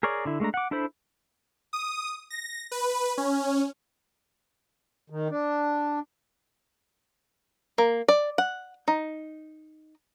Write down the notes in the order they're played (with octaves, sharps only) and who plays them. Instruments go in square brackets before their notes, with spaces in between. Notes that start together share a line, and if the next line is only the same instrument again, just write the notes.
[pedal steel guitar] G#4 A#4 C#5 D5
D3 E4
G#3 A3 D4 A#5
F#5 D6
D4 E4 A4 C5 B5
[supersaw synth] D#6
A#6
B4
C#4
[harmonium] D#3
D4
[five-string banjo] A#3
D5
F#5
D#4